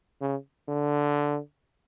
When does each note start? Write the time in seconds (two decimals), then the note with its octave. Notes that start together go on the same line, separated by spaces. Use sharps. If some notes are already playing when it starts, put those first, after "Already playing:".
0.21 C#3
0.68 D3